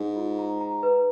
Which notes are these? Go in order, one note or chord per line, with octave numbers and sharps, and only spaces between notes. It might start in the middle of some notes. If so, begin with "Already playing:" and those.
Already playing: G#2
F4
A#5
A#5
B4